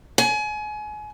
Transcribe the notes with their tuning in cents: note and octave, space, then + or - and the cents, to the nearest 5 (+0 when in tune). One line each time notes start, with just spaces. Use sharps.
G#5 +30